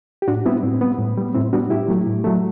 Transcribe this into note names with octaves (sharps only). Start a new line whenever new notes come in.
G4
A2 D4 F#4
G3 B3 C4 E4
A2 C4
G3 B3
A2
G3 B3
A2 C4 E4
G3 B3 D4 F#4
A2 E4 G4
F#3 A3
A2
F#3 A3